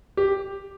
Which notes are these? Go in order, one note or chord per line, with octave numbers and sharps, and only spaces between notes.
G4